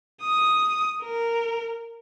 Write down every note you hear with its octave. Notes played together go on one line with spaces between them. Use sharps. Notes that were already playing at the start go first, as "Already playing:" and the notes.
D#6
A#4